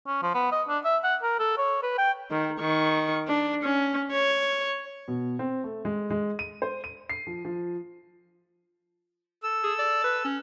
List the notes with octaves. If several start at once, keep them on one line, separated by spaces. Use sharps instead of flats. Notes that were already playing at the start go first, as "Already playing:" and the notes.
C#4
F3
B3
D#5
D4
E5
F#5
A#4
A4
C#5
B4
G5
D#3
D#3 C#6
D4
C#4
C#5
B2
C4
A3
G#3
G#3
D#7
C5
D#7
C7
F3
F3
A4 E6
G#4
D5
B4
C#4